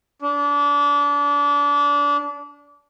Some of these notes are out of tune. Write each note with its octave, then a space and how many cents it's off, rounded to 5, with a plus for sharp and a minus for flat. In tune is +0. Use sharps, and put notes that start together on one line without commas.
D4 -30